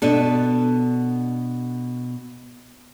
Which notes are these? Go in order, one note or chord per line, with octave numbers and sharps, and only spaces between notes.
B2 B3 D4 A4